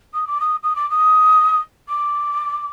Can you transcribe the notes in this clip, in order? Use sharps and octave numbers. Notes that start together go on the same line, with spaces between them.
D#6
D6
D#6
D#6
D6
D#6
D6